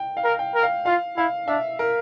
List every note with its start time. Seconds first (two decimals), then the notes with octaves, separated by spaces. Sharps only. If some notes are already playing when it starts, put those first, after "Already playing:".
Already playing: G5
0.17 F5
0.24 A#4
0.39 G5
0.55 A#4
0.63 F5
0.86 F4 F5
1.17 E4 F5
1.48 D4 E5
1.79 A#4